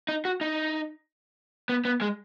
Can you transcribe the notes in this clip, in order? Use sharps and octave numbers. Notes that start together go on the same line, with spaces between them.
D#4
F#4
D#4
B3
B3
G#3